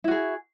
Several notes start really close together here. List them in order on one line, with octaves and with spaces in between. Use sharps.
E4 F#4 G#4